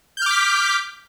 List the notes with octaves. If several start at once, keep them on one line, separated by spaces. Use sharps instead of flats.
D6 F6 G6 B6